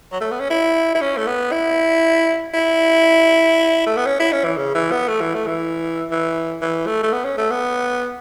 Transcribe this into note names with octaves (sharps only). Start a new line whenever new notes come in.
F#3
A3
B3
C#4
E4
E4
C#4
A3
B3
E4
E4
A3
B3
C#4
E4
C#4
E3
C#3
E3
B3
A3
E3
A3
E3
E3
E3
A3
A3
B3
C#4
A3
B3